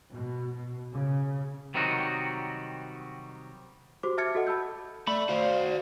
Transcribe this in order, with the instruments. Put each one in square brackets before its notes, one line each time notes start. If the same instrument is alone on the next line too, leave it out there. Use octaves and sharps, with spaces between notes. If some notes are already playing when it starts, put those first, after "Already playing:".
[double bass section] B2
B2
C#3
[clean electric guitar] C3 D#3 F#3 G3 D#4 F#4
[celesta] F#4 G4 C5 D6
E5 A5 F6 G#6 A6 C#7
F#4 A4 D#5 F#5
A5 B5 E6 G6
[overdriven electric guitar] A3 [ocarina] D5 [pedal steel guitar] B5
[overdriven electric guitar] F#4 C5 [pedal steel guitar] F5